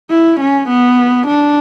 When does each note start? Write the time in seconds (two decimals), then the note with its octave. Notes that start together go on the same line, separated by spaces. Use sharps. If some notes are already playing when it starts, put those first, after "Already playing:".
0.11 E4
0.40 C#4
0.69 B3
1.27 D4